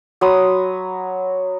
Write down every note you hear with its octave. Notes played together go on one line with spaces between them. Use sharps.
F#3 B5 C6 D#6